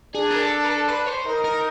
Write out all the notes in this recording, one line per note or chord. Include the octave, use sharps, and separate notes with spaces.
D4 G#4
A#4
A4
A#4
A4
B4
C5
D#4 A#4
A#4